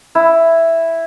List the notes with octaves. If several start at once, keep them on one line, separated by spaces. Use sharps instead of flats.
E4